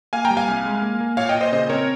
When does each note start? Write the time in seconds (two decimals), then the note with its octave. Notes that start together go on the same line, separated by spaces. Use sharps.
0.13 A#3 F5 G#5
0.25 G5 A#5
0.30 G3
0.37 F5 G#5
0.48 C2
0.65 G#3
0.82 A#3
1.00 A#3
1.17 A#2 C#5 F5
1.29 D#5 G5
1.35 A#2
1.41 C5 D#5
1.52 C#3 C5 D#5
1.69 C4 A#4 C#5